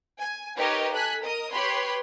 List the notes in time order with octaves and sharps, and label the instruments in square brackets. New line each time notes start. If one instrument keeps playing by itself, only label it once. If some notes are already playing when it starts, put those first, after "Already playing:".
[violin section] G#5
D#4 G4 A#4 B4 C#5 D#5
A4 G#5 F#6 B6
A#4 D#5 D#6
G4 B4 C#5 B5 C6